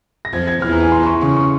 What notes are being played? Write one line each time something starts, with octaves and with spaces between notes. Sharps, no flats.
A#6
F2 F3 G#6
G#6
E2 E3 F6
A#5
G#5
C6
C#6
C#3 C#6
C#6